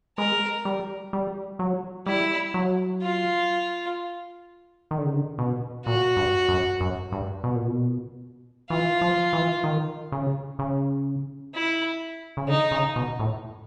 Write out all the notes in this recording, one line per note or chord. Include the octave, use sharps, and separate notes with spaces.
G#3 A#4
G3
G3
F#3
G3 E4
F#3
F4
D#3
D3
C#3
D3
B2
A#2 F#4
G2
F#2
F#2
G2
B2
A#2
B2
E3 F4
F3
E3
D#3
C#3
C#3
E4
C#3
D3 D#4
C#3
B2
A2